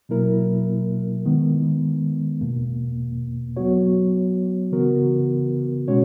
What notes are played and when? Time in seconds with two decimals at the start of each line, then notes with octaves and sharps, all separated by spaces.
0.09 B2 F#3 A#3 E4 A#4
1.26 D#3 G#3 B3
2.41 E2 B2 A#3
3.57 F#3 B3 F#4 C#5
4.72 C#3 E3 B3 F#4 A#4
5.88 B2 G#3 C#4 F#4 C#5